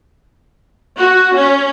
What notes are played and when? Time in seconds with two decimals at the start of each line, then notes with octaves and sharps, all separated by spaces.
0.97 F#4
1.36 C#4